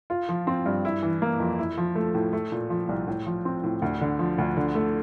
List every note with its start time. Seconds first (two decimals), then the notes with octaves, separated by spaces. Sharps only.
0.10 F4
0.29 F3
0.47 C4
0.66 G2
0.85 E4
1.03 E3
1.22 A#3
1.40 F2
1.59 E4
1.77 F3
1.95 A3
2.15 A2
2.33 A3
2.52 A#2
2.70 F3
2.89 C2
3.08 A2
3.26 F3
3.45 C4
3.64 A2
3.82 D2
4.01 D3
4.19 F3
4.38 D2
4.57 D3
4.75 A3